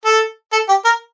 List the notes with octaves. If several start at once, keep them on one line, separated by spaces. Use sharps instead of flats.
A4
A4
G4
A#4